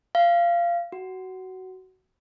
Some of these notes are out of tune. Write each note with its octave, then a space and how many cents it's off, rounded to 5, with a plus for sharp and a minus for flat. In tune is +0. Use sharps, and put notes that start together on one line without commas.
F5 -20
F#4 +15